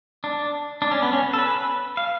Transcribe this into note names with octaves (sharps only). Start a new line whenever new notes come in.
D4
D4
C#4
B3
C#4
A4
B4
F5